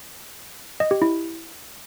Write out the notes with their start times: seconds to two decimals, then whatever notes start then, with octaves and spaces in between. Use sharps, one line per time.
0.80 D#5
0.91 G4
1.02 E4